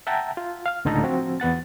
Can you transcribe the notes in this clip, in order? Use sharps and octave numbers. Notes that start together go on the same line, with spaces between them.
E5 F#5 G5 A5 A#5
F4
F5 F6
C#2 A2 D3 D#4 A4 A#5
F3 C4 F#4
E2 B3 F#5 A6